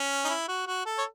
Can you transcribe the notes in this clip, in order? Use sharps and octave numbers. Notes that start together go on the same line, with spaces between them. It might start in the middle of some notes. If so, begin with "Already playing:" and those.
Already playing: C#4
D#4
E4
F#4
F#4
A4
C#5